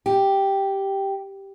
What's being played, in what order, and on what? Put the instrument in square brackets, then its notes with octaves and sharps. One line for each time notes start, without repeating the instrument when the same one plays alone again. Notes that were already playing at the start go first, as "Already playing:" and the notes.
[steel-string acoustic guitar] G4